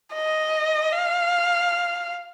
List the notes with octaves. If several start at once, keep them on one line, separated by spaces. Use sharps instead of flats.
D#5
F5